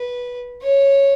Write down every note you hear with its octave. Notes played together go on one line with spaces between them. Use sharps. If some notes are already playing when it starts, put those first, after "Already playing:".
Already playing: B4
C#5